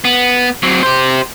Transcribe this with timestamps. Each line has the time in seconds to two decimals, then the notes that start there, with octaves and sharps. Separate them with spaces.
0.05 B3
0.63 F#3 C4
0.83 G4 C5